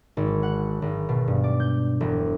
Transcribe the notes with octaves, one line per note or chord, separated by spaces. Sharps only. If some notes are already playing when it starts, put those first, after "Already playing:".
G#1
F#5
G#1
B2
G2
D5
G6
E1